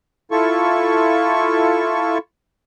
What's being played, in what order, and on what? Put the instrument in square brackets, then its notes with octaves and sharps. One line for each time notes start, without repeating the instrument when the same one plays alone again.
[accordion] E4 F4 A4 C#6